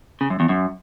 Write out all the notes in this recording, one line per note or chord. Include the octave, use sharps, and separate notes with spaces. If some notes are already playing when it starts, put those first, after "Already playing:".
C#3
F#2
E2
F#2